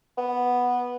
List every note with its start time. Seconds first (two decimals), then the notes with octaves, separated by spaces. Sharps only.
0.18 B3